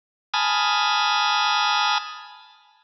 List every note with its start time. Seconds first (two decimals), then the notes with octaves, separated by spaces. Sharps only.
0.34 G#5 A5 B5 D#6 F6